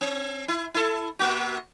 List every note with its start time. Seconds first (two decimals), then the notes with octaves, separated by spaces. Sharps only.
0.01 C4
0.48 E4
0.74 E4 A4
1.19 C3 A#3 F#4